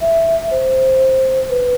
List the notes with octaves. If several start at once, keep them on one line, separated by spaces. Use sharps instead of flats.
E5
C5
B4